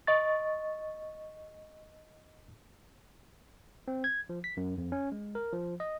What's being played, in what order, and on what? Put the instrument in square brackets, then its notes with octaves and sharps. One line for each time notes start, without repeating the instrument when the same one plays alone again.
[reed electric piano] D#5 C#6 A6
[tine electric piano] C4
G#6
F3
B6
F#2
F2
C#4
G#3
A#4
F3
D#5